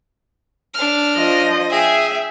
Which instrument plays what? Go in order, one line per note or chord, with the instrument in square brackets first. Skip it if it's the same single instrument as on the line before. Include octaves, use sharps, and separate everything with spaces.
[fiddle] D4 F6
[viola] F3 D#5
[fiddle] G#4 G5 [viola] E5